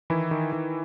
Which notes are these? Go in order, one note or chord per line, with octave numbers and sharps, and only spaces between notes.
D#3 E3 E4
D#3
D#3